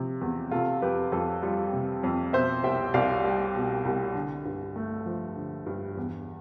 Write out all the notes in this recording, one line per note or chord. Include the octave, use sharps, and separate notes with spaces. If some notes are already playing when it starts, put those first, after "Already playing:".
Already playing: C3 F3
E2
C3 F4 A4
F2 G4 B4
F2 F4 A4
G3 F4
C3
F2
B2 C5 E5
C2 E5 G5
C2 D5 F5
G3
B2
C2
D3
G2
A3
F3
D3
G2
E2